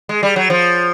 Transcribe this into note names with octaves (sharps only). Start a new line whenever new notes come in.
G#3
G3
F#3
F3